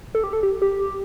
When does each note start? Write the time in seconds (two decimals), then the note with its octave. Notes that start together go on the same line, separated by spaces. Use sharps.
0.15 A4
0.24 G4
0.33 A4
0.43 G4
0.62 G4